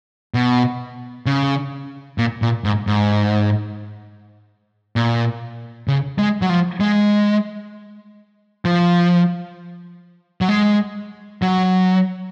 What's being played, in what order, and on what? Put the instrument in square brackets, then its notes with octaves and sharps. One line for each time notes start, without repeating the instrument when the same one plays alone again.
[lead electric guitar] B2
C#3
A#2
A#2
G#2
G#2
A#2
C#3
G#3
F#3
F3
G#3
F3
F#3
G#3
F#3